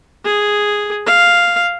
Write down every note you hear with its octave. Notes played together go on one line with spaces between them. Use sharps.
G#4
F5